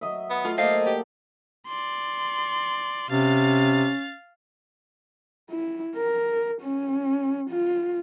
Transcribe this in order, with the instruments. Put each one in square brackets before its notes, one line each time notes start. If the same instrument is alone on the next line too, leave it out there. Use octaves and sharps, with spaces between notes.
[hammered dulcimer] F#3 D#5 E5
[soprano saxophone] B3
[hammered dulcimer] A3 [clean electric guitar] F4
[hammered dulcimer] A#3 A4 [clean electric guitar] C5 D#5 [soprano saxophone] F5
[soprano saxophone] G4 [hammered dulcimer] D5
[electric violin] D5 C6
[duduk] C3 [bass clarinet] C#4 [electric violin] F5 A6
[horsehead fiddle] E4
A#4
C#4
F4